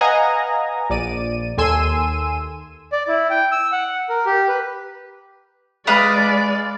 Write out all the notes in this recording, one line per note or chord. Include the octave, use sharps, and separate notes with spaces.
B4 D#5 F5 F#5 G#5 A#5
A#1 D5 D#7
D#2 A4 G#5 C6 E6 D#7
D5
E4
G5
E6
F#5
A#4
G4
B4
G#3 B4 D5 F5 D#6